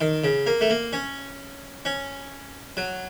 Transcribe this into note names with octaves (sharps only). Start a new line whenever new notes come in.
D#3
C#3
A#3
A3
A#3
C#4
C#4
F#3